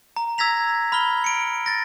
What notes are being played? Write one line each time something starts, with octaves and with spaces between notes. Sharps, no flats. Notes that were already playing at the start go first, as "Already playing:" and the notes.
A#5
E6 G#6 A#6 B6 F7
B5 F6 G7
C#7 D7
A6 A#6